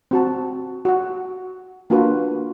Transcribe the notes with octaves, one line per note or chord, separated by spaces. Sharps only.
C4 F#4 A5
F#4 F#5
A#3 D4 F4 F#4 B4 F#5